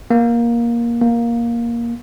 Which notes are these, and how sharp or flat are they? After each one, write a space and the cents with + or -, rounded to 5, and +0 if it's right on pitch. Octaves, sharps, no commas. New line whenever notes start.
A#3 +15
A#3 +10